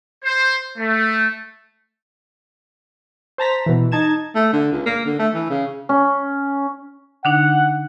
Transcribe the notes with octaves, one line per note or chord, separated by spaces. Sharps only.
C5
A3
C5 A5 A#5 B6
B2 E3
D#4 A5 G#6 E7
A3
D3
C#2
A#3
D3
A3
E3
C#3
C#4
D3 D4 D#4 F#5